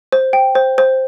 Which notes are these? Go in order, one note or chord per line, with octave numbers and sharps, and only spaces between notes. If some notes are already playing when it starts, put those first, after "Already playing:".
C5
G5
C5
C5